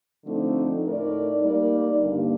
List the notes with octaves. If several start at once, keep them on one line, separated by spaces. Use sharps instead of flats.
D3 F3 A3 C4 D#4
A2 A3 D#4 A#4 D5
G3 A#3 D#4 A#4 D5
G2 D3 G3 A#3